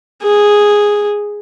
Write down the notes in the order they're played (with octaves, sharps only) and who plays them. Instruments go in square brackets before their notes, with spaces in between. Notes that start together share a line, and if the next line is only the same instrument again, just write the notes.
[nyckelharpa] G#4